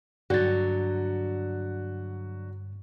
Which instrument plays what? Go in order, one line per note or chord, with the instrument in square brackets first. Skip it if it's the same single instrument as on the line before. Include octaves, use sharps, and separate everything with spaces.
[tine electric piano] G2 A6 [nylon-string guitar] D3 F#3 [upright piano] F#4